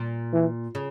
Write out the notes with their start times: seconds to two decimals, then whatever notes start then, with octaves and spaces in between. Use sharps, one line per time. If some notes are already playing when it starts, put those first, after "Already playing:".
Already playing: A#2
0.33 E3
0.75 C#3